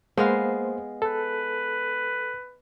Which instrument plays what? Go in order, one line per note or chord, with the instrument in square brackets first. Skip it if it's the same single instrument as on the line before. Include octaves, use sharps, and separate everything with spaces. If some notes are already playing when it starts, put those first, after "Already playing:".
[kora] G#3 B3 F5 [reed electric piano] A#3 C5
[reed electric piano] A4 [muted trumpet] B4